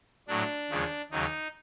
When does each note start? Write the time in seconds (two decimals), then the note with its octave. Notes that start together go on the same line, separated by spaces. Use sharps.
0.28 A2 F#3 D4
0.70 D#2 C#3 F3 G#3
1.11 D#2 C#3 F#3 D#4